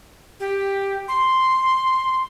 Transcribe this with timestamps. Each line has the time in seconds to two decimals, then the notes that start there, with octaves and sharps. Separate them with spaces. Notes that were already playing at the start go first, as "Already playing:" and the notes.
0.40 G4
1.08 C6